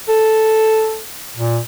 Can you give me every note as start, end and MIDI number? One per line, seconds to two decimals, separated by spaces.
0.09 1.00 69
1.37 1.59 46